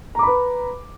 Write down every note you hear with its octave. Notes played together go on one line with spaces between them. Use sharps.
B4 A#5 B5 D6